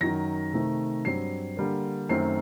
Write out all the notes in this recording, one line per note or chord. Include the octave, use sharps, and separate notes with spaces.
F#2 D#3 F#3 A#6
C3 D#3 A3
G2 F#3 C4 C7
D3 G3 A#3
F#2 D#3 A3 C4 C7